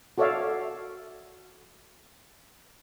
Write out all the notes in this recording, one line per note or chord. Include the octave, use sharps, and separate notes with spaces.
F#4 A4 C#5 D5 E5 F5